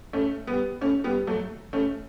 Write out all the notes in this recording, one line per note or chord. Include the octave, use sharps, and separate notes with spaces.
A3 C#4
G3 B3
A3 C#4
G3 B3
F#3 A3
A3 C#4